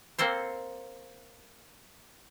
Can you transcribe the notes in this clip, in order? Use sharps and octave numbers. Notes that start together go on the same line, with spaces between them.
A#3 C4 A4 C5